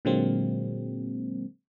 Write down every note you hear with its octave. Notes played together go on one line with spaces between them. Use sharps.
A#2 D3 F#3 G#3 A#3 C4